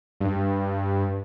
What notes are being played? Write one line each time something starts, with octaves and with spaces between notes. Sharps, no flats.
G2